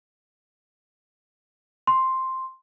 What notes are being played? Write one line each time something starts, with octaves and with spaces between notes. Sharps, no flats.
C6